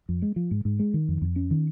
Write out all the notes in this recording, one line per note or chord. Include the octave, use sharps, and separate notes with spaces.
F2
G#3
F3
G#2
G#2
G#3
D#3
F2
F2
C#4
D#3